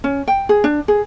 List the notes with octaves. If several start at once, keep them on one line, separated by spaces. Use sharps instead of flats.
C#4
G5
G#4
D4
G#4